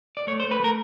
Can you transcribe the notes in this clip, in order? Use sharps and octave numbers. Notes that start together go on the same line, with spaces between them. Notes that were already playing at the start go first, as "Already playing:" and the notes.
D5
A3 C#5
C5
A3
B4
A3 A#4